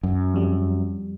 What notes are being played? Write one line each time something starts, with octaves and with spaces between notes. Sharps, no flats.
F#2
F2 G3